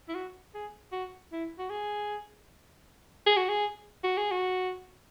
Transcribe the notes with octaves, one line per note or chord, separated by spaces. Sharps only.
E4
F#4
G#4
F#4
E4
F#4
G#4
G#4
F#4
G#4
F#4
G#4
F#4